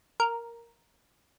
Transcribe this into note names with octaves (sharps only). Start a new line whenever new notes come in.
A#4